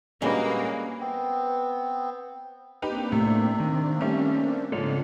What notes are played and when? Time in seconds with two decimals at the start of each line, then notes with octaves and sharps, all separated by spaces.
0.22 A#2 G3 G#3 A#3 C#4 D4 F#4 B4
1.00 B3 C4
2.82 A#3 C4 D4 D#4 G4 B4
3.12 A2 C3 A3
3.60 D#3
4.01 G3 A3 C#4
4.72 G#2 C#3 F3 C4 D4 A4 C#5